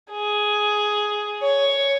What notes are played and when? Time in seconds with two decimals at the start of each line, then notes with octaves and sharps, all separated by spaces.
0.12 G#4
1.43 C#5